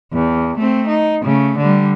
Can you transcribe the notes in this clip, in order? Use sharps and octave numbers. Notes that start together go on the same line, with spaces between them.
E2
A3 C4
D#4
C#3 A3
D3 G3